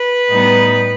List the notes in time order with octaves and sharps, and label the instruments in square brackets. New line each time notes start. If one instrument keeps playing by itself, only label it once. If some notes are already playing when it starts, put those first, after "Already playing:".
Already playing: [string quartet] B4
A2 G3 B3 D#4